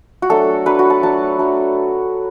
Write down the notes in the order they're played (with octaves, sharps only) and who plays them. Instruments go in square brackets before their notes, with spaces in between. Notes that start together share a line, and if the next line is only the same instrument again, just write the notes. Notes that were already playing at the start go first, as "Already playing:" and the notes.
[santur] F#4
F#3 A3 D4 A4
F#3 A3 D4 B4
F#4
A5
F#3 A3 D4 A5
F#3 A3 D4